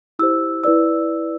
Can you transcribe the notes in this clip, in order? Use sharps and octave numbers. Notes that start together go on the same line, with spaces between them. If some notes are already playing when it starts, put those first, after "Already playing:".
E4 G4 C5 E6
E4 B4 D5 E6